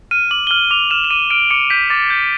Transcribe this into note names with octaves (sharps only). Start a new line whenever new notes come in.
F6 D#7
D6 F#7
G7
F6 F#7
D6 F7
F6 E7
E7
D6 D#7
F6 D7
D6 C#7
G6 B6
D6 A6
G6